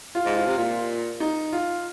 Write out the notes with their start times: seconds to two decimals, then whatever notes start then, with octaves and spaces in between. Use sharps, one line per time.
0.15 F4
0.25 G#2
0.36 F4
0.46 C3
0.58 A#2 F4
1.20 D#4
1.52 F4